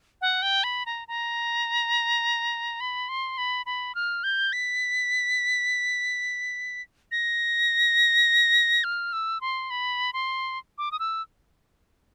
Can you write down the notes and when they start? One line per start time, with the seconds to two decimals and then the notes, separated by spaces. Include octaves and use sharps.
0.21 F#5
0.42 G5
0.64 B5
0.86 A#5
1.08 A#5
2.80 B5
3.09 C6
3.38 B5
3.66 B5
3.95 F6
4.24 G6
4.53 B6
7.12 A#6
8.84 F6
9.13 E6
9.41 C6
9.70 B5
10.13 C6
10.78 D6
10.92 D#6
10.99 E6